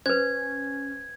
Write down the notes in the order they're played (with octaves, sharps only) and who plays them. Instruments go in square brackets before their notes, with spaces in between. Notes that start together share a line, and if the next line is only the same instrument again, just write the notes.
[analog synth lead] C#4 [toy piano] B4 C5 [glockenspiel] G#6